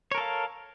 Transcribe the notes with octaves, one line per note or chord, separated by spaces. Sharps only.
A4 A#4 C#5 F5